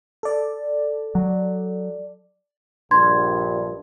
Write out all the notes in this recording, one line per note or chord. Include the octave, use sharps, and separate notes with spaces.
A4 D5
F#3
A#1 G2 C6 G#6